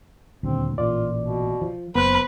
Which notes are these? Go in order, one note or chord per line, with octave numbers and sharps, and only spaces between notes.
D#1 D2 C4
A1 A#2 F4 D5
B2
F3
F#1 B3 B4 C5 F#6